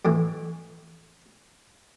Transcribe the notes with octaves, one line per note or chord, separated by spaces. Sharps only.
F2 A2 E3